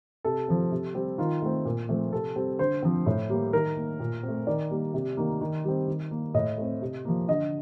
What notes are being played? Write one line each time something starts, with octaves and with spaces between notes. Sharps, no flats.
C3 A4
F3 C4
C3
G3 C4
D#3 F4
A3 C4
A#2
F3 A3 C4
C3 A4
G3 C4
D3 C5
F3 C4
A2
G3 A#3
D#3 A#4
A#3
A#2
C4
A3
D#3 D5
G3 A#3
C3
D#3 A#3
D#3
G3 C4
D#3
A#3
A2 D#5
A3 C4
C3
F3 A#3
D3 D#5